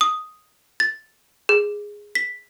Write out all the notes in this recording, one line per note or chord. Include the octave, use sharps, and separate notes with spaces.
D#6
A6
G#4
B6